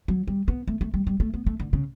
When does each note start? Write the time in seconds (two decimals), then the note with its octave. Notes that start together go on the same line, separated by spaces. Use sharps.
0.08 F#3
0.28 G3
0.48 B3
0.68 A3
0.81 A3
0.94 G3
1.07 G3
1.20 A3
1.34 B3
1.46 A3
1.60 D3
1.73 C#3